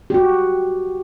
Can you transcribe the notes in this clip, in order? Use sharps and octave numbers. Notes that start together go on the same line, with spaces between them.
F#4 G4